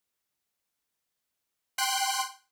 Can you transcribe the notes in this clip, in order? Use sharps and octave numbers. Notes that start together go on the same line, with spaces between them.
G5 C6 F#6